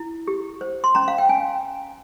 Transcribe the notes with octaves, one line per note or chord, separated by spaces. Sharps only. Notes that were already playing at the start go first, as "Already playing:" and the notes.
Already playing: E4
G4
C5
C6
C#4 A#5
F5
G5
C#4 G#5